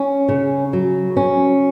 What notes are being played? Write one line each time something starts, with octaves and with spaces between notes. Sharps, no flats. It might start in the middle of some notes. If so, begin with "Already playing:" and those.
Already playing: C#4
C#3
F#3
C#4